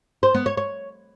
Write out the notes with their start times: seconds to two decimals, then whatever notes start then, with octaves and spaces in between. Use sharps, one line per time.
0.23 C5
0.34 B3
0.46 C#5
0.57 C#5